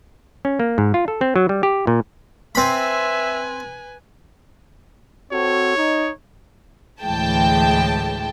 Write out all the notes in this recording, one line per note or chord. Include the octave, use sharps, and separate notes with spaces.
C#4
A#3
G#2
F4
A4
C4
F#3
G3
G4
A#2
C4 B4 E5 G#5 B5
C4 F#4 A4 C#5
D#4
D2 A2 E3 G#3 G5 A5